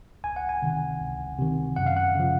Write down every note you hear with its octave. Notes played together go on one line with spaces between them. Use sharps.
C#2 G#5
F#5
G#5
C3 D#3
C#2
C3 D#3
F#2 F#5
F5
F#5
C#3 F3